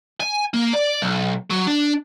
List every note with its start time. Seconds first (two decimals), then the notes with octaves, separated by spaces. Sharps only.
0.20 G#5
0.54 A#3
0.73 D5
1.02 B1
1.50 F#3
1.67 D4